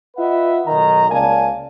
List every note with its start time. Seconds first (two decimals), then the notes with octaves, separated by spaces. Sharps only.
0.17 F4 B4 D#5 E5 F#5
0.67 B1 D#3 D#5 A#5
1.09 C#2 A#3 D5 F5 G#5 A5